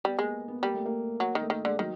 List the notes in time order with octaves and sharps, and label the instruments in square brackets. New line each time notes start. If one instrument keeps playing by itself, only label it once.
[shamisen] G3 [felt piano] B3
[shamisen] G#3 [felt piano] A#3
[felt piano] B3
[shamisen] G3 [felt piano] A#3
[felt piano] A3
A#3
[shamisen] F#3
D#3
[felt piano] A3
[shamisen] D#3 [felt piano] A#3
[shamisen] D3 [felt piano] G#3
[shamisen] D#3 [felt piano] F#3